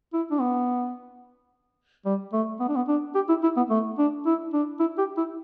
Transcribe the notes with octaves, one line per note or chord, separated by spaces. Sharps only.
E4
D4
B3
G3
A3
B3
D4
B3
D4
G4
E4
E4
B3
A3
D4
E4
D4
E4
G4
E4